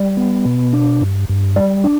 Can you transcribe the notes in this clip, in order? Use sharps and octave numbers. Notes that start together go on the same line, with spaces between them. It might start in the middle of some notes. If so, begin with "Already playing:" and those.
Already playing: G3
B3
B2
D4
G2
G2
G3
D4